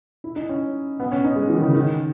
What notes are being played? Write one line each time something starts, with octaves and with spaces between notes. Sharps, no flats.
E4
D#4
C#4
B3
C#4
D#4
G#3
E3
D#3
C#3
D#3